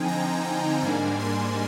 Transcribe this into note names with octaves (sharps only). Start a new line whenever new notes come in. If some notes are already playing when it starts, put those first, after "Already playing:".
Already playing: D3 F3 C4 D#4 G5 G#5
A#5
G5
G#2 G3 A#3 D4 G#5
C6